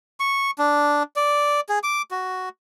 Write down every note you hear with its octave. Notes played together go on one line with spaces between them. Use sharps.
C#6
D4
D5
G#4
D6
F#4